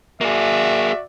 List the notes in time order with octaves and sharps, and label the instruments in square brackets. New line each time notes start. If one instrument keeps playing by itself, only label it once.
[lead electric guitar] A#3 G#4 [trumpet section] F#4 D5 E5